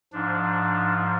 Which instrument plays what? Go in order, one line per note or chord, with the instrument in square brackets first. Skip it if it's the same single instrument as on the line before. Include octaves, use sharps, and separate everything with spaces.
[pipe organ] G#2 F3 D4